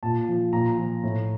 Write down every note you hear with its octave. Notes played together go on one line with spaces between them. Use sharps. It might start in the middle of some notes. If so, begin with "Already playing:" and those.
A#2 A5
F3
A#2 A#5
F3
A2